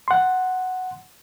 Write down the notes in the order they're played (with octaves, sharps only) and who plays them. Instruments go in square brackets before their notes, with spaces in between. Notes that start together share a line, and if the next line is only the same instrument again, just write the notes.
[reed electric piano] F#5 C6